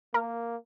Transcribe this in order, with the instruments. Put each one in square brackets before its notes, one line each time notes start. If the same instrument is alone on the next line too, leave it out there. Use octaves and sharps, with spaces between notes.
[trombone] A#3 [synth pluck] A#4